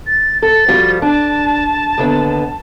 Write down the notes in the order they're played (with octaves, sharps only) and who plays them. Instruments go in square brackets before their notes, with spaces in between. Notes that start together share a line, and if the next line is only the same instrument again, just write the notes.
[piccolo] A6
[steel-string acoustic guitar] A4 [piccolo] A6
[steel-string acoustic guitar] F3 G3 F#4
[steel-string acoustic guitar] D4 [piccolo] A5
[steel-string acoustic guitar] D#2 D3 B3